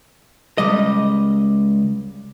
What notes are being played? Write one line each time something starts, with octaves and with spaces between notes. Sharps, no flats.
C#2 G3 D#5